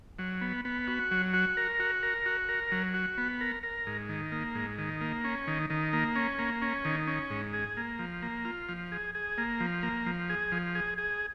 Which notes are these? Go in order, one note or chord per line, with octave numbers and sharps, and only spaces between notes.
F#3
B3
B3
F#4
F#3
F#4
A#4
F#4
A#4
F#4
A#4
F#3
F#4
B3
A#4
A#4
G#2
D#3
A#3
G#2
D#3
A#3
C#4
D#3
D#3
A#3
C#4
A#3
C#4
D#3
C#4
G#2
G#4
A#3
F3
A#3
F4
F3
G#4
G#4
A#3
F3
A#3
F3
G#4
F3
G#4
G#4